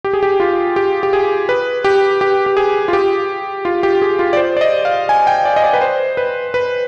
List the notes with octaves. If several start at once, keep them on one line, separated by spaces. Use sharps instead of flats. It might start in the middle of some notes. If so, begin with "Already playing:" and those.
G4
G#4
G4
F4
G4
G4
G#4
B4
G4
G4
G4
G#4
F4
G4
F4
G4
G#4
F4
D5
C5
D5
D#5
F5
G#5
G5
D5
D#5
D5
B4
C5
B4
B4